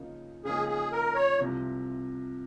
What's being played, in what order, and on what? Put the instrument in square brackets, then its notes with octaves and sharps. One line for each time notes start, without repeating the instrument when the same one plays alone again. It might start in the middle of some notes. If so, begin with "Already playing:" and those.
Already playing: [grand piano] C#3 F3 A#3 D#4
[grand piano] C#3 F3 A#3 D#4 [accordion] G#4
[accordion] G#4
A#4
C#5
[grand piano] C2 C3 F3